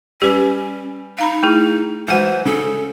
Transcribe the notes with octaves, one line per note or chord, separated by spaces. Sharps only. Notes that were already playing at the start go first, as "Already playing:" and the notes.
G3 C#4 G4 B4
D#4 F5 A#5 B5
A3 E4 G#4
E3 F#3 G#3 C5 F#5
C#3 A4